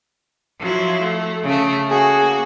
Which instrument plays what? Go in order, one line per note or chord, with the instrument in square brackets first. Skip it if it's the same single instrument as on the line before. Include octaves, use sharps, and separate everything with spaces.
[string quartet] F3 F#3 E4
A3
C#3 A3
[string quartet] A#3 F#4 [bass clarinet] G#4